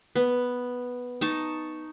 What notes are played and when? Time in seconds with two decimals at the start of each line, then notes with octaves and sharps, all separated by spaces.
0.16 B3
1.21 D#4 A5 C#6